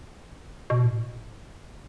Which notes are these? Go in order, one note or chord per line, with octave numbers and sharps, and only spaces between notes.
B2
A2